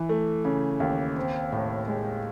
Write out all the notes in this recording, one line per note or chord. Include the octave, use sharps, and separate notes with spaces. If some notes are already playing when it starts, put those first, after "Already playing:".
Already playing: E3
A3
C#3
D#2
C4
A2
G#3